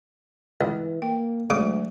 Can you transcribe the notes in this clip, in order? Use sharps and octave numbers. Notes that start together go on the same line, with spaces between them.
C#2 E3
A#3 G5
D2 C#3 F#3 G#3 A3 D6 D#6